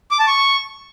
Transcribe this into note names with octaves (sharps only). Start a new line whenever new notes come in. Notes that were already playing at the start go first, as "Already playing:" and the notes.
D6
A5
C#6